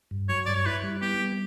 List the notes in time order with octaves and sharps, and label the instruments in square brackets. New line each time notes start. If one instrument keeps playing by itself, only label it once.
[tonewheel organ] G2
[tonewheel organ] F#3 [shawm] C#5
[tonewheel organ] G2 [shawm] D5
[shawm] C#5
[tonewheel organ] E4 [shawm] B4
[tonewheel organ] G3
[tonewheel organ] B3 [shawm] G4
[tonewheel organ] G3